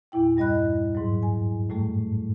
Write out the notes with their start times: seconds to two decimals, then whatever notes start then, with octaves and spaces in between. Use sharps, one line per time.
0.12 E2 A#2 E4 G5
0.37 G2 G3 D#5 B5 F#6
0.95 G#2 F#3
1.23 G#5
1.69 F#2 A2 G3 A3